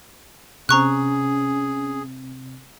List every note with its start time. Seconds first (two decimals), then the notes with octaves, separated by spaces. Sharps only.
0.69 C3 C4 C#4 G#4 A#5 C#6 F#6